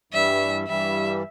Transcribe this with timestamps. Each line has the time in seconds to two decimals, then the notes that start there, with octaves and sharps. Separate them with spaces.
0.12 G2 E3 G3 E5
0.68 G2 E3 G3 E5